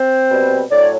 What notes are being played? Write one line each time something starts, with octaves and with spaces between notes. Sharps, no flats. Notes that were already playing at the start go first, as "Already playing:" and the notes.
Already playing: C4 C5
B2 G3
A2 F#3 D4 D5
C#5